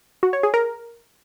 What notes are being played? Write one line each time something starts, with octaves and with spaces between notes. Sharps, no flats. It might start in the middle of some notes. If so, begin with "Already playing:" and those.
F#4
C#5
G#4
A#4